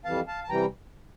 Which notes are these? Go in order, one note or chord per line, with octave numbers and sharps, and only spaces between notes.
F2 E3 G3 F5 A5
F5 A5
A5
C3 E3 G3 G5 A#5